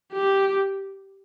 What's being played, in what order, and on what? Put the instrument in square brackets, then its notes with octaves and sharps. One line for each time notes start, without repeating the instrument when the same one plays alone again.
[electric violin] G4